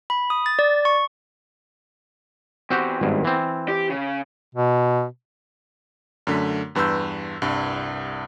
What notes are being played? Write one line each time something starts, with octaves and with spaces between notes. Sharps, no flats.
B5
D#6
A6
D5
C#6
E2 C4 F#4 G4
G#1 G2
E3 C4
G4
C#3
B2
F#2 D3 A3 B6
E2 G2 B4 C6 E6 G6
C2 G2